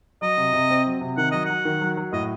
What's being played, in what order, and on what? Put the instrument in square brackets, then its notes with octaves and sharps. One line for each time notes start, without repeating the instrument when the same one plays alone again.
[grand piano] F#3 [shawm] D#5
[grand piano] C3
C3
C4
F#3
C3
[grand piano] D#3 [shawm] F#5
[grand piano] F#3 [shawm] D#5
[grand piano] F#3 [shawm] F#5
[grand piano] D#3
F#3
F#3
[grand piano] A2 [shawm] D#5